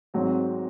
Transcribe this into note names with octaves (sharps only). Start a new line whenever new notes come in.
G#1 G#2 F#3 C4